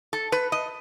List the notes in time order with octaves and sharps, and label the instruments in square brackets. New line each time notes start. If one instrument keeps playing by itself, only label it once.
[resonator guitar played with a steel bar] A4
B4
D#5